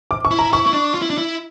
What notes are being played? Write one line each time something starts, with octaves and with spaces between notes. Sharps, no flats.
D6
C#6
E4
A#5
E4 C#6
E4
D4
F4
E4
D4
E4